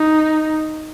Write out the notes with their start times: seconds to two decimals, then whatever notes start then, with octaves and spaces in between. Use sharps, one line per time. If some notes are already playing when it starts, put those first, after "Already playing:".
Already playing: D#4